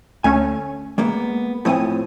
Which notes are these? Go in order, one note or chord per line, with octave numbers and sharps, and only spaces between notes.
D2 A3 C#4 G#5
G#3 A#3 B3
A2 F3 C4 E4 G#5 D#6